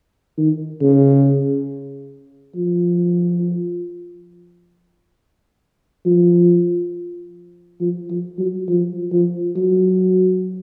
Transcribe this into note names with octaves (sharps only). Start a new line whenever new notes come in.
D#3
C#3
F3
F3
F3
F3
F#3
F3
F3
F#3